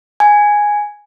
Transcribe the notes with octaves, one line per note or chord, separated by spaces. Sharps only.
G#5